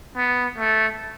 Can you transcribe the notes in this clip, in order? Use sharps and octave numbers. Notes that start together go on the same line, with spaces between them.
B3
A3